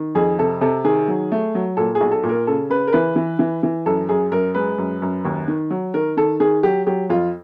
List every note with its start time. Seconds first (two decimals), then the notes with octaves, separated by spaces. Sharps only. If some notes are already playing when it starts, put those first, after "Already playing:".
Already playing: D#3
0.15 F2 G#4
0.38 C3 A4
0.61 C3 A4
0.84 D#3 G#4
1.08 F#3
1.32 A3
1.55 F#3
1.77 A#2 A4
1.95 G#4
2.01 B1
2.12 A4
2.23 A#2
2.29 A#4
2.47 C#3 A4
2.70 C#3 B4
2.88 A#4
2.93 E3 B4
3.16 E3
3.39 E3
3.63 E3
3.86 F#2 A4
4.09 F#2 G#4
4.32 F#2 A#4
4.55 G#3 B4
4.78 F#2
5.02 F#2
5.25 D#2
5.48 D#3
5.70 F#3
5.94 D#3 A#4
6.17 D#3 A4
6.40 D#3 G#4
6.63 F#3 G4
6.86 F#3 G4
7.10 F2 F4